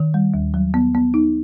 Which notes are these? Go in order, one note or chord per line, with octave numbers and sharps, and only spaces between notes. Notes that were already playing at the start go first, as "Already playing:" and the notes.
Already playing: D#3
G3
D#2
F#3
B3
B3
D#4